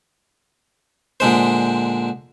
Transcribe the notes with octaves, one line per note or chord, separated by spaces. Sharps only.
A#2 D3 G#3 C5